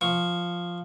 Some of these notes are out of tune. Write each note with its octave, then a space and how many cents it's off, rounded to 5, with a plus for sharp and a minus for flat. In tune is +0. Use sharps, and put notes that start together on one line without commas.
F3 +0 C#6 +0